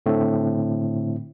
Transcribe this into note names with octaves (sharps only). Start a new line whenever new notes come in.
A2 D3 A3 C4